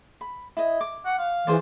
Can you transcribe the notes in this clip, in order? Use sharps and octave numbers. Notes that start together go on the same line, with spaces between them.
B5
E4 D#5
D6
F#5
F5
E3 G#4 C5 D5